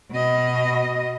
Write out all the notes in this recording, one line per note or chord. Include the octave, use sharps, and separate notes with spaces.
B2 D#5